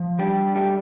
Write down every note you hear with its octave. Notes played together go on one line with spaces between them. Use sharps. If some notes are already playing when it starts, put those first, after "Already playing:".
Already playing: F3
G3 D4 G4
G3 A3 G4